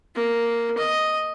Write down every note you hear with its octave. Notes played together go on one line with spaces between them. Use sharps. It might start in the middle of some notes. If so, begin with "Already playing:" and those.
A#3
D#5